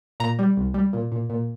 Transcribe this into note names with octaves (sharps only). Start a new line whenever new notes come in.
A#2 A#5
G3
C2
G3
A#2
A#2
A#2